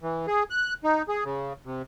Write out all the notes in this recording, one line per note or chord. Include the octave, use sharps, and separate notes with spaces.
E3
G#4
F#6
D#4
G#4
C#3
C3